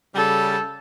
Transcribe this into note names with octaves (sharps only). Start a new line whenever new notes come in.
C#3 G3 A4